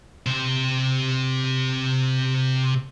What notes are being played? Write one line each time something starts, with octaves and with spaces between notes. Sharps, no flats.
C3 C5